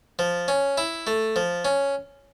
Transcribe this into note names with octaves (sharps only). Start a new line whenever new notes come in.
F3
C#4
E4
A3
F3
C#4